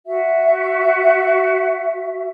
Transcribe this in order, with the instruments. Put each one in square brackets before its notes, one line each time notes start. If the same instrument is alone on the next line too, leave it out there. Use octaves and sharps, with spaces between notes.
[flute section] F#4 E5